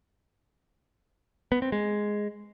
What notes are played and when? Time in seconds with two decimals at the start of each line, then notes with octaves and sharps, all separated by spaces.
1.52 B3
1.62 C4
1.72 G#3